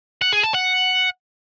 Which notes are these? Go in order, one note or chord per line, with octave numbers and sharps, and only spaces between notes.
F#5
G#4
A5
F#5